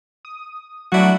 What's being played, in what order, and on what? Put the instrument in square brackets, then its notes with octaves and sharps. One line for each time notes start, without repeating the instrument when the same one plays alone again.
[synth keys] D#6
[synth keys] F#3 A3 [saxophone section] D4 E4 F#4